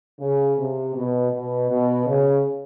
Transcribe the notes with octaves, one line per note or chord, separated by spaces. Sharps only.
C#3
C3
B2
B2
B2
C#3